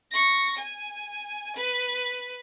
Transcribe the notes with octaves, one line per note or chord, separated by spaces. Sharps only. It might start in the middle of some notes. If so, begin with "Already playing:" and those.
C#6 A#6
G#5
B4